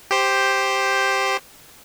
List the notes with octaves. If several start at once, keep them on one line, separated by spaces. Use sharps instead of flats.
G4 C5